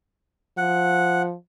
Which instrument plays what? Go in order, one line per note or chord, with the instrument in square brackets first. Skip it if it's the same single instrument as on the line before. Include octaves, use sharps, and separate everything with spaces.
[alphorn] F3 [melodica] F#5